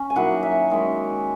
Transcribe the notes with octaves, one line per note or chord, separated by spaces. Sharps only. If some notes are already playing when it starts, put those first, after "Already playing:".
Already playing: C#4
G#5
D#3 F#3 A#3 E4 F#5
E5
D#3 G#3 C#4